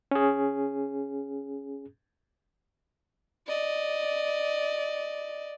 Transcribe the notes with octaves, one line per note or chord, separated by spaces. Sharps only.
C#4 G#4
D5 D#5